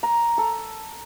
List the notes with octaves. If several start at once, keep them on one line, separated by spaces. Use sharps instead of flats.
A#5
A4